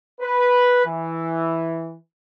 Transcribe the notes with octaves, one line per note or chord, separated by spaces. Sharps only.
B4
E3